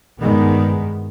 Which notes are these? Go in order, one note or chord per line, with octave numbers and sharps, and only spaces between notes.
G2 D#3 G#3 B3